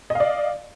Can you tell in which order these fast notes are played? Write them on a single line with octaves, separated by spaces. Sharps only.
D#5 F5 D5